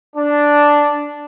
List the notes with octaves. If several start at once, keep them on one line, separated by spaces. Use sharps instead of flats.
D4